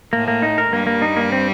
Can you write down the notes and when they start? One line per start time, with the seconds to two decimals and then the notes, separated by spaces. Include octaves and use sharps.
0.13 A2 A3 A#3
0.28 A#3
0.42 D#4
0.58 A#4
0.72 G2 G3 A#3
0.87 A#3
1.02 D#4
1.17 A#3
1.32 C4